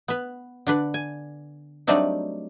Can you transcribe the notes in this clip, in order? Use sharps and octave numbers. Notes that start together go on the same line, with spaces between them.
B3 B4
D3 D4 B4
G#5
F#3 G3 A3 C4 D4 D#4